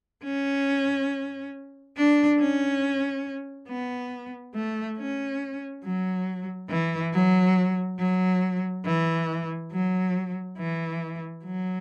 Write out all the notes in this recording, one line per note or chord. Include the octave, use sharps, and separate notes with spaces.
C#4
D4
C#4
B3
A3
C#4
F#3
E3
F#3
F#3
E3
F#3
E3
F#3